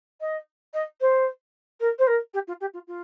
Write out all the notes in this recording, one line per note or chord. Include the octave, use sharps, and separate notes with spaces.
D#5
D#5
C5
A#4
C5
A#4
G4
F4
G4
F4
F4